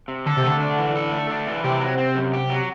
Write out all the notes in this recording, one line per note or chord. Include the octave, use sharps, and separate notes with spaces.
C3
D3 A4
C3
D3 A3
D4
E3
A4
A3
D4
E3
C3 G4
F#3
C4
F#2
G4
F#3